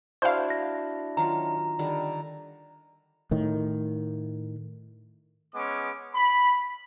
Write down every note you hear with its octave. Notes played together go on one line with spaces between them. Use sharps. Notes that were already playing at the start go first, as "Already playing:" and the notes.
D4 E4 F#4 C5 F5
A#6
D#3 F#3 F4 A#5
D3 D#3 G3
A2 D#3
G#3 B3 C#4 D6
B5